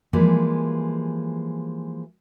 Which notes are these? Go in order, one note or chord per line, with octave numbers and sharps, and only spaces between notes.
E3 F3 G3 G#3 A#3